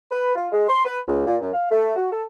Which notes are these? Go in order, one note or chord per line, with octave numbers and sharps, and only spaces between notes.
B4
F4
G#3
C6
B4
C#2
A#2
F#2
F5
A3
F#4
A4